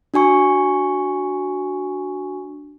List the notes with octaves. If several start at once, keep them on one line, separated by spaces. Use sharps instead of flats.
D4 F#4 G#5 C#6